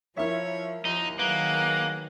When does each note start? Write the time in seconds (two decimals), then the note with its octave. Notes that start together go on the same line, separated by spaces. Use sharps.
0.17 F3 E4 A#4 C#5 E5
0.85 D#2 F3 D#4
1.19 D#3 F#3 A#3 G#4 B4 F#5